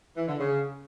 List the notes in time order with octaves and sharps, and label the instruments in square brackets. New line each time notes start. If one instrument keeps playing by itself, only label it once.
[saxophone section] E3
D3
C#3